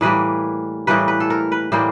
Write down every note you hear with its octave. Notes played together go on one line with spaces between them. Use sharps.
A2 E3 G3 A#3 B4
A2 E3 G3 A#3 B4
B4
A4
A#4
B4
A2 E3 G3 A#3 C5